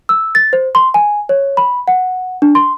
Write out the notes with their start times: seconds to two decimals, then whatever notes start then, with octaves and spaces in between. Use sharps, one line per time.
0.09 E6
0.35 A6
0.53 C5
0.75 C6
0.94 G#5
1.29 C#5
1.57 B5
1.88 F#5
2.42 D4
2.55 C6